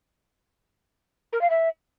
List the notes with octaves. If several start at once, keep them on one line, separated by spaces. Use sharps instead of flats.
A#4
F5
E5